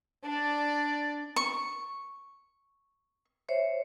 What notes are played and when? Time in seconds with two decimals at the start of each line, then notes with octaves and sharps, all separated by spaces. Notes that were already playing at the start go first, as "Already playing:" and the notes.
0.24 D4 D5
1.36 C#6
3.49 C5 C#5 E5